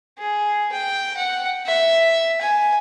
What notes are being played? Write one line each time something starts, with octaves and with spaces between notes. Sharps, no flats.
G#4
G5
F#5
E5
G#5